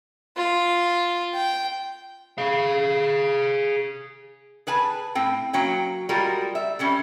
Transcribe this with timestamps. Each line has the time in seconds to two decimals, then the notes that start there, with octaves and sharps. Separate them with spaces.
0.37 F4
1.34 G5
2.38 G#4 F5
4.67 G#4 B4 G#5 A5
5.15 A2 C4 G5
5.53 F#3 A#3 C#4 G5
6.09 G3 G#3 F4 F#4 A#4
6.55 E5
6.79 D3 G3 C#4